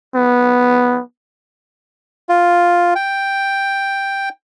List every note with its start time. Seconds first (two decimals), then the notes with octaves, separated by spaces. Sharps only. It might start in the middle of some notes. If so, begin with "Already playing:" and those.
0.14 B3
2.29 F4
2.95 G5